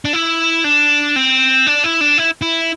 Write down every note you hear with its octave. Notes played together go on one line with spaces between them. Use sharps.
D4
E4
D4
C4
D4
E4
D4
E4
E4